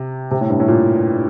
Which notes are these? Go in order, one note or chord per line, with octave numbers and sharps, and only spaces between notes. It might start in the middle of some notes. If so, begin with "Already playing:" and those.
Already playing: C3
C3
A2
G2
A2
A#2